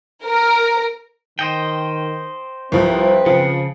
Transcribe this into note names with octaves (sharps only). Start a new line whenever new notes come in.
A#4
D#3 C5 D#5 G5
C2 F3 C4 B4
C#3 F3